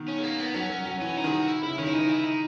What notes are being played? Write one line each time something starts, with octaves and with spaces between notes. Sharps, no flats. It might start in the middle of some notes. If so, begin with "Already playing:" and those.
Already playing: B2 D#3
C#4
G#3
A#3
B3
F#3 C#4
F#3
F#3
E3 C#4
D#4
D#3 G#4
F#4
E4
C#3 E4
D#3 C#4
E4
E3 D#4
E4
D#4